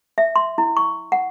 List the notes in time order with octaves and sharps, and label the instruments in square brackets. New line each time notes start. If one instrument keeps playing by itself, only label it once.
[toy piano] E5
C6
E4
C#6
F#5